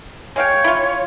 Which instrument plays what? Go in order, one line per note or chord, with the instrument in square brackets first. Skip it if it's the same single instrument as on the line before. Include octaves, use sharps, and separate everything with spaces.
[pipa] G#3 F5 G5 [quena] C#5
[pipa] E4 F4